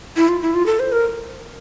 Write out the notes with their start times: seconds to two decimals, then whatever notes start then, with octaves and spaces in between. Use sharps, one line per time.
0.16 E4
0.29 F4
0.42 E4
0.55 F4
0.66 A4
0.80 C5
0.92 A#4